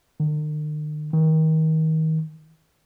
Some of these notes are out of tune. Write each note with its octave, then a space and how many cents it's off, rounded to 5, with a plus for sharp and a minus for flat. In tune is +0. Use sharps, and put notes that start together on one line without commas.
D#3 -45
D#3 +30